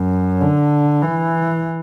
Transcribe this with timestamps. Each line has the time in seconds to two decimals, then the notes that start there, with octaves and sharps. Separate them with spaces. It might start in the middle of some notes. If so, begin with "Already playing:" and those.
Already playing: F#2
0.41 D3
1.02 E3